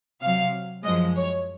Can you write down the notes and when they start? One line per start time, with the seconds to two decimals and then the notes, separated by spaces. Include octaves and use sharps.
0.21 C3 F#3 F5
0.84 F#2 F3 G#3 D#5
1.16 C#5